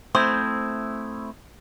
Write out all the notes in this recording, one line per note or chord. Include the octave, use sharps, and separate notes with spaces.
A3 C4 E4 C5 D#6 E6 G#6